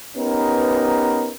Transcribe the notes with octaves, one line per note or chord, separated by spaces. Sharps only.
B3 C#4 D#4 G4 A#4 B4